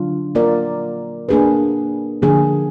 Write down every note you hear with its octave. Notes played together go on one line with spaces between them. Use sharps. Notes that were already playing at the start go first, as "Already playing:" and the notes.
Already playing: D3 F#3 D4 F4
A#3 F4 A#4 D5
A#3 D4 G#4 B4
D3 F3 A#3 D4 G#4